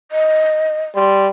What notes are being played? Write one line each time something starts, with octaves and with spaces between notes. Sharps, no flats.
D#5
G3 C6